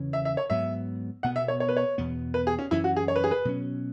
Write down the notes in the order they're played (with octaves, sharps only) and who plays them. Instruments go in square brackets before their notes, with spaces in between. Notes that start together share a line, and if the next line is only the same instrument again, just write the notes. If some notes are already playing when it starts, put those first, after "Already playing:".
Already playing: [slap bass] E2 C#3 E3 C#4
[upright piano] E5
E5
C#5
[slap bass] G#2 F#3 B3 [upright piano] E5
[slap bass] B2 B3 [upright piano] F#5
[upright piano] E5
C#5
C#5
B4
C#5
[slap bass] E2 B2 B3
[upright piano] B4
G#4
C#4
[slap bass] F#2 E3 C#4 [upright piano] E4
[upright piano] F#4
G#4
C#5
B4
G#4
B4
[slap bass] B2 F#3 C#4